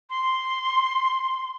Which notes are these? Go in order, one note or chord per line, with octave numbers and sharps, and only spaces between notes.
C6